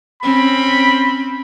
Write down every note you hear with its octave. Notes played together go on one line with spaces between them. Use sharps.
C4 C#4 B5